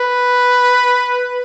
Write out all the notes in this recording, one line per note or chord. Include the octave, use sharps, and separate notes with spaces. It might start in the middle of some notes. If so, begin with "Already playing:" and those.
Already playing: B4